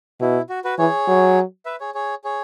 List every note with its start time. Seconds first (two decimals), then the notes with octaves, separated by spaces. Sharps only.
0.21 B2 E4
0.50 F#4
0.64 F#4 B4
0.78 E3 G#4 C#5
1.08 F#3
1.65 B4 E5
1.80 G#4 C#5
1.94 G#4 C#5
2.24 G#4 C#5